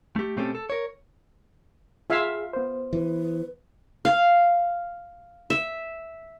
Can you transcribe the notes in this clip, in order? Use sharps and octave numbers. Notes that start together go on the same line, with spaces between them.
A3 G4
B2 A3 C4 C#4 G4 A4
A4
A#4 C#5
F4 G#4 E5 F5
B3 C5
E3 B4
F5
E5